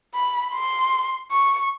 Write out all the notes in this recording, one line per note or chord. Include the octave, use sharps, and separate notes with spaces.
B5
C6
C#6